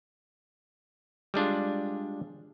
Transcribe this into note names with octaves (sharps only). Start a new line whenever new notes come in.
G3 G#3 D4 F4